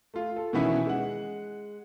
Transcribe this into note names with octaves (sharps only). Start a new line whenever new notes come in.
A3 F4
A4
B2 D#3 E3 B3 C#4 E4
G#3 F#5